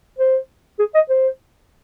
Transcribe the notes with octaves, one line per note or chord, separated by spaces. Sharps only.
C5
G#4
D#5
C5